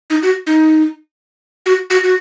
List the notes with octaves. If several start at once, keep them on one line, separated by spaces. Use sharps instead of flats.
D#4
F#4
D#4
F#4
F#4
F#4